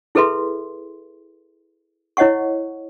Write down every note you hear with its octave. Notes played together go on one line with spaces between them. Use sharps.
E4 G#4 A4 B4 E5 C6
E4 C#5 D#5 F#5 C#6